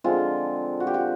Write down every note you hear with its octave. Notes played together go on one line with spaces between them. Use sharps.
D3 F3 G#3 C4 F4
F#4
G4
F#4